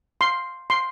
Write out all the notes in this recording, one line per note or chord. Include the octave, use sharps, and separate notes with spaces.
C6
C6